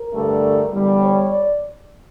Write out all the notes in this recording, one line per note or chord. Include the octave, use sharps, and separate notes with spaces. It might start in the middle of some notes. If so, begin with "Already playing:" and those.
Already playing: A#4
G2 D3 A3
E2 D3 G3
C#5
D5